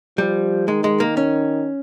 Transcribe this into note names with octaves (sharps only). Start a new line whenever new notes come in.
F3 G3
D#3 G#3
G#3
A#3
C#4